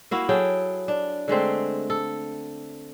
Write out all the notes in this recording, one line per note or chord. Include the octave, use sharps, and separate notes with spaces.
A#3 E4 F#4 F5
F#3 G#4 A4 G5
D4
D3 G#3 A3 C4
A4